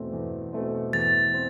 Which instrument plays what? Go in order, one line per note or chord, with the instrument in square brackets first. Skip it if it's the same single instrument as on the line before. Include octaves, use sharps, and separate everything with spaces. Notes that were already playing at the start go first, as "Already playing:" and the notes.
Already playing: [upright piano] E2 B2 A3 C4
E2
B2 A3 C4
[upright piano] E2 [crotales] A6
[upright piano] C4